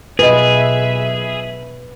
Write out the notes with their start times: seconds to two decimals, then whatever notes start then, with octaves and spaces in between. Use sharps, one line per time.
0.19 B1 F4 G#4 B4 D#5 E5